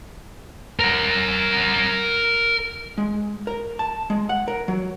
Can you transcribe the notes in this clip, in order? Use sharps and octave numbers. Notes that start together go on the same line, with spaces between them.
A#4 F#5
G#3
A#4
A5
G#3
F#5
A#4
F#3